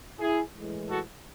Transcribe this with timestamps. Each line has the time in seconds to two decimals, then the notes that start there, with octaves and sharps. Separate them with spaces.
0.20 E4 G#4
0.56 A2 E3 G#3
0.89 F#4 A4